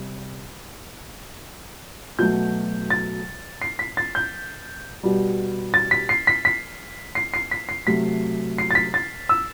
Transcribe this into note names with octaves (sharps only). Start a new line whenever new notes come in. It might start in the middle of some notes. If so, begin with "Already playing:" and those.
Already playing: C3 G3
B2 F#3 A3 G6
A6
C7
B6
A6
G6
B2 G3
A6
B6
C7
B6
B6
C7
C7
B6
C7
C3 F#3 A3 B6
C7
A6
B6
A6
E6